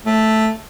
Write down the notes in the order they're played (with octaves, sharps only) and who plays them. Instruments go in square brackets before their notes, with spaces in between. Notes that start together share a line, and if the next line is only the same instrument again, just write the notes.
[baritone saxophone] A3